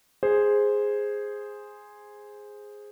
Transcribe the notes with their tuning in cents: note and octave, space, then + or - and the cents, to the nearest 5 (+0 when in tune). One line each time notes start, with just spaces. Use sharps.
G#4 -5 C5 +0